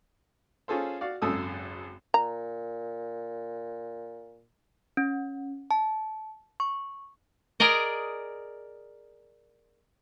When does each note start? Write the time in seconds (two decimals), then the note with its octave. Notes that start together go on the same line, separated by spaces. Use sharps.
0.68 C#4 F4 G#4 A4 C5
1.01 F#4 D5 F5
1.22 G#1 F#2 C#3 A4 D#6 E6
2.14 A#2 A#5
4.97 C#4
5.71 A5
6.60 C#6
7.60 G#4 A#4 D5 D#5